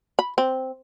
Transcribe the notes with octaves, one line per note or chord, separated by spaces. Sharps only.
B5
C4